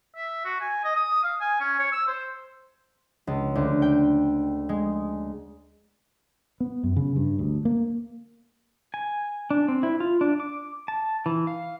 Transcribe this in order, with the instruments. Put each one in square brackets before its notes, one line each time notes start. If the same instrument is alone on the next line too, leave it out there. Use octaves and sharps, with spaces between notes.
[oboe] E5
F#4
G#5
D#5
D#6
F5
G#5
C#4
C#5
E6
C5
[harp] C#2
D2
G5
G#3
[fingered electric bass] B3
F#2
C#3
G2
D2
A#3
[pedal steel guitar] G#5
D4
C4
E4
F4
D4
D6
A5
E3
F5